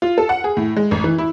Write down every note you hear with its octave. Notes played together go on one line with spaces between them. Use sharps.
F4
A4
F#5
G#4
A2
G#3
A1
E3
E4